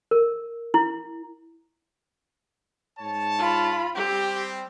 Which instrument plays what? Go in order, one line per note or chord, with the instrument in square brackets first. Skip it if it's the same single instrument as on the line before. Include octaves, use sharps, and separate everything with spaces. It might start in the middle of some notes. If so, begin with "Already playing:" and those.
[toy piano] A#4
E4
[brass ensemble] G#2 C#5 A5
[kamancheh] F4 B5
[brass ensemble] G3 C4 [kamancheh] G4